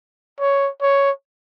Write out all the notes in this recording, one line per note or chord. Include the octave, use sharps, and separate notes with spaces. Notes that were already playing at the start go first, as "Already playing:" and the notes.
C#5
C#5